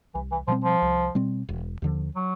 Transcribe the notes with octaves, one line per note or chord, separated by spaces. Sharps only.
C2 E3
E3
B2 F3 G3 C4
F3
C2
B2 G3 C4
E1
D#2 D3 F3
F#3